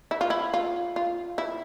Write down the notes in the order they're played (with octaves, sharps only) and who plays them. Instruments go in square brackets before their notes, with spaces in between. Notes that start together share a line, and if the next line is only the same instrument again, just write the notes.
[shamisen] E4
F4
E4
F4
F4
E4